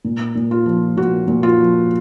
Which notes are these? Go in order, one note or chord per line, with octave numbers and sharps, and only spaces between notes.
A#2
A#2
F4
F3
A#2 F#4
A#2
F4
F3